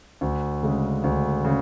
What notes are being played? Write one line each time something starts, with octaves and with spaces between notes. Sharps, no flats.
D2
C#3 G#3
D2
C#3